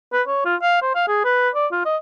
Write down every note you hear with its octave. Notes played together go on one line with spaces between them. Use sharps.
B4
C#5
F4
F5
C5
F5
G#4
B4
D5
F4
D#5